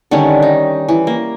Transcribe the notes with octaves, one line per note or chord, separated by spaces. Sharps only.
D3 D#3 G3 C#4
D#4
E3
A#3